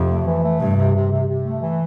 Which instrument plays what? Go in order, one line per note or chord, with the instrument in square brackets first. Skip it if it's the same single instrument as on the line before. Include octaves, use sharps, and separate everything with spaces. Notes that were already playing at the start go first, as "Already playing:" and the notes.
Already playing: [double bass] F2 [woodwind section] C3
[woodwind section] A3
E3
A3
[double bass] G2 [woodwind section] C3
[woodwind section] C3
C3
C3
C3
A3
E3